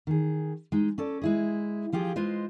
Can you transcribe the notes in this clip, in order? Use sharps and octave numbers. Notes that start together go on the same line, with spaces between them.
D#3 G#4
G#3 D#4
C#4 A4 D5
G#3 E4 G#4
F3 F4 G4 G#4
G#3 F4 B4 C5 D#5